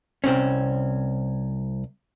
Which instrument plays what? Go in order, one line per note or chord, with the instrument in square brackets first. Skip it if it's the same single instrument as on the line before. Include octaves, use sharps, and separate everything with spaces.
[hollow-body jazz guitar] C2 C4 C#4